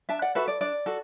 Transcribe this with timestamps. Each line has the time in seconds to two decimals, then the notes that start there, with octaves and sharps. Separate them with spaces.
0.09 D4 E5 A5
0.22 D5 F#5
0.35 F#4 A4 B4 E5
0.48 D5
0.61 D4 D5
0.86 F#4 A4